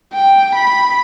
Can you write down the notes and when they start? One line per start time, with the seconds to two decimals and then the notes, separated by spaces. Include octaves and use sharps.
0.14 G5
0.55 B5